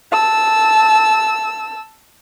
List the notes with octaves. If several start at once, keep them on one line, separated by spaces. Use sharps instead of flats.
A5 E6